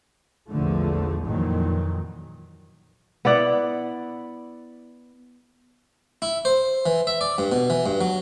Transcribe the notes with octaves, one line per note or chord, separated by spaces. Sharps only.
A#1 E2 D3 F3 A3
F2 A#2 D#3 E3 F#3
B3 E4 D5 F#5
E4
C5
E3
E5
D5
G2
B2
E3
G2
F#3